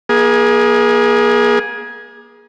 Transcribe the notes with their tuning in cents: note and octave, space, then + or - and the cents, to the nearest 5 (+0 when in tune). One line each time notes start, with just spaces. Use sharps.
A#3 +40 G#4 +0